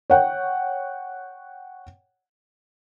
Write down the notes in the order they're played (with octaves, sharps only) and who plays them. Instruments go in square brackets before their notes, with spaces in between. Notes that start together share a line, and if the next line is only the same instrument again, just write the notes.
[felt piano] C#5 F#5 G5